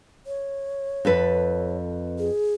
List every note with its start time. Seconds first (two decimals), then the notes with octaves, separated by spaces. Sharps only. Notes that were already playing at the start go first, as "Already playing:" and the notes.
0.27 C#5
1.05 F2 A4 B4
2.19 G#4